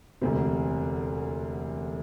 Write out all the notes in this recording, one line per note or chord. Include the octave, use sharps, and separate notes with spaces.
E1 D2 C3